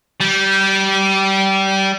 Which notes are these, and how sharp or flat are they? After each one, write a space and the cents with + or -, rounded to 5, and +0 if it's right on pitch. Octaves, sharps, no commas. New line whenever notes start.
G3 -20